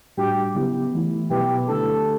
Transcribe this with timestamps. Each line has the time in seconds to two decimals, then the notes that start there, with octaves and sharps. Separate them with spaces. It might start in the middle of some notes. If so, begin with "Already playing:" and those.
0.17 A2 G3 D4 F#4 G4
0.55 C#3 F#3 B3 E4 G4
0.93 E3 A3 E4
1.30 B2 F#3 B3 E4 G4 B4
1.67 D3 A3 D4 G4 A4